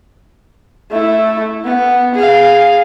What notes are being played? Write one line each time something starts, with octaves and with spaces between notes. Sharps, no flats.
A3 E4
B3
G#4 F5